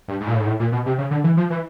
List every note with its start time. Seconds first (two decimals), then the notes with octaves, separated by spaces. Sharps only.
0.08 G2
0.20 G#2
0.27 A#2
0.34 A2
0.40 G#2
0.47 A2
0.60 A#2
0.72 B2
0.86 C3
0.98 C#3
1.11 D3
1.24 E3
1.37 F3
1.50 E3